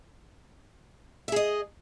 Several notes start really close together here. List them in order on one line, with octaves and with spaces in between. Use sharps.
E5 G#4 D#5